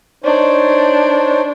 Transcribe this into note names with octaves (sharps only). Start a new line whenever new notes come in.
D4 D#4 C5 C#5